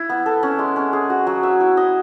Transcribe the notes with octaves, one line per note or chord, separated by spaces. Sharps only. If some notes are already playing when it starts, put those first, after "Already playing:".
Already playing: E4
B3
A4
C#4
G#3
C#4
G#4
F#4
F#3
E5
E4
D#5